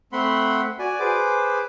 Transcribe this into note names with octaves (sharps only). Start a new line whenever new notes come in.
A3 C4 F#5 B5 C6
F#4 D5 G#5
G#4 B4 C5 D6